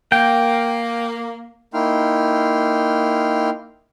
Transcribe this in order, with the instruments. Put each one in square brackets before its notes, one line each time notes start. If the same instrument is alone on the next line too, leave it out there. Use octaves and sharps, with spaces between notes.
[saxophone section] A#3 [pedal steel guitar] G5
[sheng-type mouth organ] A#3 D#4 E4 G5 C6 F6